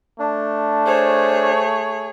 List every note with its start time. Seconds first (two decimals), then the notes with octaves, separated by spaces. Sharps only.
0.20 A3 D4
0.86 G#4 C5 C#5